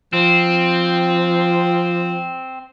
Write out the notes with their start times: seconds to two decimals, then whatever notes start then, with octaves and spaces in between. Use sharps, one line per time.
0.13 F3 C4